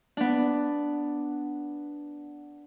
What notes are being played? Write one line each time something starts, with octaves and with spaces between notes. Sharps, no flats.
B3 D4